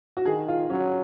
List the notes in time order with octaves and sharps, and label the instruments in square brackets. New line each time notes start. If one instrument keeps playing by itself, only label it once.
[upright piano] F#4
[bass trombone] D#3 [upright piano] G#4
[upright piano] F4
[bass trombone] F#3 [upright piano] C#4